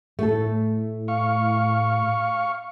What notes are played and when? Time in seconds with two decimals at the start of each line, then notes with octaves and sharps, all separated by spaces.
0.19 A2 A3 A4
1.08 F5 C#6